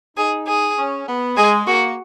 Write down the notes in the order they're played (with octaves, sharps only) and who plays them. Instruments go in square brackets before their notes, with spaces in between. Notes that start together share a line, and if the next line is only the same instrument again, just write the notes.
[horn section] D#4 [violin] G#4
[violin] G#4
[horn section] C#4
B3
[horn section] G#3 [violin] G#4
[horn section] A#3 [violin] F#4